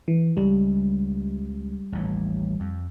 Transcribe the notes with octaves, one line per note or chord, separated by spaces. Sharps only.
E3
C#2 G3
A1 D#2 A2
F2